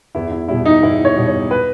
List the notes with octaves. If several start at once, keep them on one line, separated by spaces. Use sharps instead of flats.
E2 E4
E4
B2 G3 E4
D#4
E2 E4
C#5
B2 G3
C#5
B4